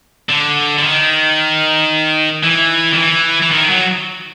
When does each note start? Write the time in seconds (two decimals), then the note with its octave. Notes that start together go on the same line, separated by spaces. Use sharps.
0.29 D3
0.79 D3
0.83 D#3
2.44 E3
2.93 D#3
2.98 E3
3.42 E3
3.51 D#3
3.69 F#3